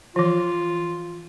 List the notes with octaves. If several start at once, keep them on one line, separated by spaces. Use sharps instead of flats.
E3 F3 F4